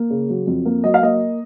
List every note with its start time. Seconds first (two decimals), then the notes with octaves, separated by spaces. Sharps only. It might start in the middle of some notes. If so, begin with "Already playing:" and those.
Already playing: A#3
0.10 C#3
0.30 F#3
0.47 F2
0.65 A#3
0.84 F#3 D#5
0.94 F5
1.02 A#3 D#5